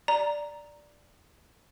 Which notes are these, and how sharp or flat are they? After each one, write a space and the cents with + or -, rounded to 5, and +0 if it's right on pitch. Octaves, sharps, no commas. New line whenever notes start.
D5 +0 A#5 +0